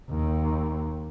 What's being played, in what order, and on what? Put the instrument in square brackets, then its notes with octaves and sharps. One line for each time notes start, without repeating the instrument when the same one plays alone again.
[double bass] D#2